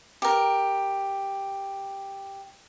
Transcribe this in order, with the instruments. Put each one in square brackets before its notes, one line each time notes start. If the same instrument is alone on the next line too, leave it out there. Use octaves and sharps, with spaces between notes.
[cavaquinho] G4 A#4